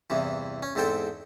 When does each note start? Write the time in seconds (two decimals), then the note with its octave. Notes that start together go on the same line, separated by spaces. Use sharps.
0.10 E2 G2 C3 E3
0.63 C#4
0.75 E2 G#2 C4 A4 C5 G5